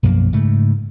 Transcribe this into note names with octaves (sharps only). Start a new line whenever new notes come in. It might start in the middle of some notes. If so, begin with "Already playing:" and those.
B1 F#2 F3 A#3
G#2 C#3 A3